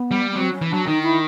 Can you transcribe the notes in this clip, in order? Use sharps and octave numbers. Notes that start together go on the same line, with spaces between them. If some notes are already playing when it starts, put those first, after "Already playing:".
Already playing: B3
G3
B3
F#3 C4
C#4
E3
F#3 D4
D#3 D#4
E4